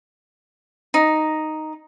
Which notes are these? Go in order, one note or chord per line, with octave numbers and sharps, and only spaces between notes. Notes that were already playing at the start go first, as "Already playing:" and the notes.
D#4